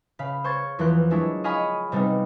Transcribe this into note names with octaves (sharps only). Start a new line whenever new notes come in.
C#3 F5 B5
C5 C6 C#6 G#6 A6
E2 E3 F3 A#4 C6 F#6
F#3 G#3 D4 E4 C#5
D#5 F5 G#5 B5 C#6 D#6
C3 G3 B3 C4 D#4